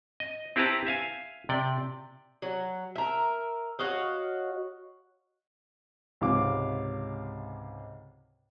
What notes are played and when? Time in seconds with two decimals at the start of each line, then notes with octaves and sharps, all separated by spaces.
0.20 D#5
0.56 C4 E4 G4 B4 A5 A#5
0.87 E5 F5 G#5
1.49 C3 D5 G5
2.42 F#3
2.95 A#4 E5
3.79 F#4 C#5 D#5 F5
6.21 C#2 G#2 C3 F5 D6